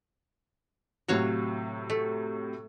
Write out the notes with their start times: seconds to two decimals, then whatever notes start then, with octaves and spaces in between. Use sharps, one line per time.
1.08 A2 C3 F#3 F#4 C#5 F5
1.90 A3